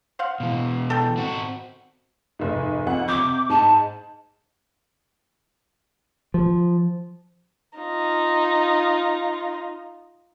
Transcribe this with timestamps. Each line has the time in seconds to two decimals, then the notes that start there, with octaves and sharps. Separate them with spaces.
0.19 C5 F5 F#5
0.40 B2 E3
0.90 A4 G5
1.17 C4 F#4
2.39 F1 G#2
2.87 F2 F#5
3.08 C3 D6 G6
3.49 G#2 A5
6.34 F3
7.78 D#4 F4